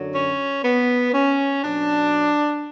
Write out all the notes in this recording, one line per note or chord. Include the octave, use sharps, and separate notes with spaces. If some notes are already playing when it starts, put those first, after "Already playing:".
Already playing: F#2 D3 F#3
C#4
B3
C#4
B2 F#3 D4